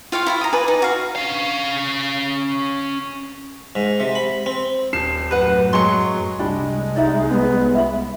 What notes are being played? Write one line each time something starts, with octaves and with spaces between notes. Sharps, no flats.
F4 F5 G5 C#6
E4 F4 F5
A#5 D#6
B4 D5 G#5
D#4
F#4 F5
C#4 F5
G#2
C3
B5
C4
D#1 C7 E7
F#2 A2 B4 F#5
F#3 G#3 C6 C#6
C2 G3 G#3 D4 G4 B5
D#4 D5 E5 F#5
B3 C#4
E5 F5 B5